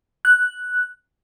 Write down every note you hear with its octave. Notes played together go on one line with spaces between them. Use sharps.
F#6